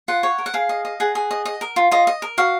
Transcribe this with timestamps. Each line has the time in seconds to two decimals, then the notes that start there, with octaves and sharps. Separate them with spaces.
0.08 F4 F#5
0.23 C#5
0.38 A#4
0.46 F#5
0.54 G#4 F5
0.69 D#5
0.85 D#5
1.00 G#4 F#5
1.15 G#4
1.31 D#5
1.45 D#5
1.61 A#4
1.76 F4
1.91 F4 D#5
2.07 D#5
2.22 A#4
2.38 F#4 F5